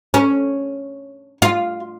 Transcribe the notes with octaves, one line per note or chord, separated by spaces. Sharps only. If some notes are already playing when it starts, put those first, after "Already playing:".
C#4
F4